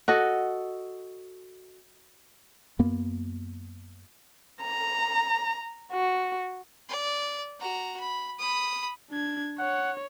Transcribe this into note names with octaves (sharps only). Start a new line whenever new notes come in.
F#4 A4 D#5
F#2 A#3 B3
A#5
F#4
D5
F#4 A#5
B5
B5 D#6
D4 G#6
C#5 F#5